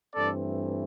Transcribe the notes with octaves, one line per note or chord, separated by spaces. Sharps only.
G2 E3 A3 C4 A4 D5